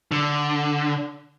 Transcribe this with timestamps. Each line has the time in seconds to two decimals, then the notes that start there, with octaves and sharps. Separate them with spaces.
0.11 D3